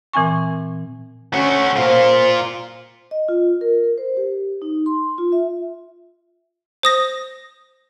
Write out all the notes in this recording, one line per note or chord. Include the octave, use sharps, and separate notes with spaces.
A#2 E3 C4 G#5 C#6
A3 C#4 F#4
A#2 F4 C5
D#5
F4
A#4
C5
G4
D#4
C6
F4
E5
C5 D#6 A#6